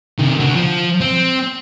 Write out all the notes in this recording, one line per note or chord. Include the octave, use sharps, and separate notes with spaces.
C3 D#3
D3 F#4
F3
C4